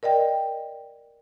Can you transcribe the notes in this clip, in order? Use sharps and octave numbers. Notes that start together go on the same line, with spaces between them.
A#4 D5 D#5 G5